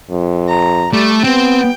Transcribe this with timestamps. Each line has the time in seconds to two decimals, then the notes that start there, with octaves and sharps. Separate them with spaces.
0.10 F2
0.49 A#5
0.93 G3 A3
1.24 B3 C4 G5